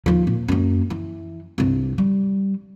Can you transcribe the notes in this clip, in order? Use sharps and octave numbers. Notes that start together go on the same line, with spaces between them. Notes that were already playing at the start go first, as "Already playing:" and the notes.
D#2 F3
A#2
F#2 A#3
E3
C2 G2
G3